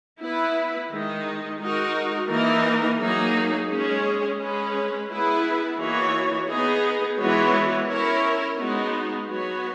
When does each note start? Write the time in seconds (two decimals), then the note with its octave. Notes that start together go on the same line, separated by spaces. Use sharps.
0.20 B3 E4 B4
0.89 D#3 G#3 D#4
1.59 G#3 D#4 F#4 A#4
2.28 E3 A#3 D#4 A#4
2.98 F#3 A#3 D#4 G#4
3.68 G#3 C#4 G#4 C#5
4.38 G#3 C#4 G#4 B4
5.08 B3 E4 G#4 B4
5.77 E3 A#3 D#4 F#4 C#5
6.47 B3 D#4 G#4
7.17 E3 G#3 B3 F#4 C#5
7.87 C#4 E4 A#4 C#5
8.57 G#3 B3 D#4 F#4
9.26 F#3 B3 F#4 C#5